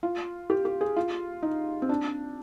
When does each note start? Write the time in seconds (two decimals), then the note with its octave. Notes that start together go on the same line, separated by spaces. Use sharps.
0.03 F4
0.50 G4
0.65 G4
0.81 G#4
0.96 F4
1.42 D#4
1.82 C4
1.89 D4